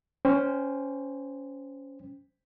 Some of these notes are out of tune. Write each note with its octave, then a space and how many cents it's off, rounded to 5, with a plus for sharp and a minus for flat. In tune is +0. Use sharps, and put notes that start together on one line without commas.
C#4 +10 C5 -15 G5 +30